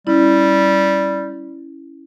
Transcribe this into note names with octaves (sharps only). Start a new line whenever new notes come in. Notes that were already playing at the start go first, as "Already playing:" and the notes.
G3 C#4 E4